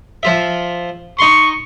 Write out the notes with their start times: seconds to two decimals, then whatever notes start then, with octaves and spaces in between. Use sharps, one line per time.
0.23 F3 F4 E5
1.19 D#4 C6 C#6